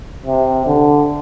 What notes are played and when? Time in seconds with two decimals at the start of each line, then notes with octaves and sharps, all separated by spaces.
0.26 C3
0.66 D3